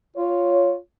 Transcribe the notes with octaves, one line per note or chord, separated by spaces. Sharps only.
F4 C#5